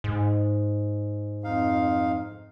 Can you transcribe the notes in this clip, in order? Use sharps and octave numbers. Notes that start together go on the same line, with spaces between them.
G#2
F2 D#4 F5